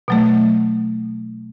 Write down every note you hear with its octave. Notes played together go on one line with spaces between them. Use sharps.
B2 F#3 A3